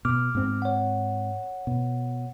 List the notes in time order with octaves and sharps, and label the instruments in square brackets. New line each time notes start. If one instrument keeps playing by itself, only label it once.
[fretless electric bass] B2 [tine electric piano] D6 F6
[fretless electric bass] G#2 C4
[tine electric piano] C#5 F#5
[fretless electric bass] B2